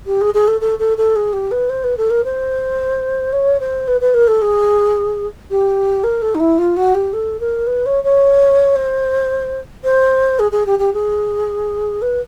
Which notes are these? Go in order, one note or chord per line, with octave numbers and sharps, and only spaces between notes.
G4
G#4
G#4
A4
A4
A4
A4
G#4
G4
B4
C5
B4
A4
A#4
C5
C#5
C5
B4
B4
A#4
A4
G#4
G4
A#4
A4
D#4
E4
F4
F#4
G4
A4
A#4
B4
C#5
C#5
C5
C5
G#4
G#4
G4
G4
G#4
B4